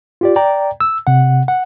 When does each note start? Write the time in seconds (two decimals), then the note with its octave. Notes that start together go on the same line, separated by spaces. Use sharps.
0.21 F4 G4 D5
0.36 D5 G5 A#5
0.80 E6
1.07 C3 F#5
1.48 F#5